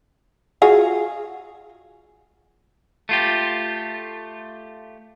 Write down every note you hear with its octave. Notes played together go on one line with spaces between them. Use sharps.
F4 F#4 G#4
A3 F4 G4